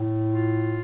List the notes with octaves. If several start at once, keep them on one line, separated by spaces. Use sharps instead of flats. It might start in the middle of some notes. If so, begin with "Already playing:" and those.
Already playing: A2
F4